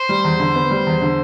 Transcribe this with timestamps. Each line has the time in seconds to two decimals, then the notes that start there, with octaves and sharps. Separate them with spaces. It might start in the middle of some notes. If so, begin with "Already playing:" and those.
Already playing: C5
0.09 G3
0.24 E2
0.40 D3
0.55 B3
0.71 G3
0.87 E2
1.02 D3